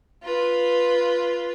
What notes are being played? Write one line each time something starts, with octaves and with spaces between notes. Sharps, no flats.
F4 B4